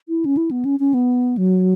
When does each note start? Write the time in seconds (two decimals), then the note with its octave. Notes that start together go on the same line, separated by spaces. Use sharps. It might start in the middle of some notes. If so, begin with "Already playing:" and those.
0.09 E4
0.25 C#4
0.37 E4
0.51 B3
0.65 C#4
0.80 C#4
0.94 B3
1.37 F#3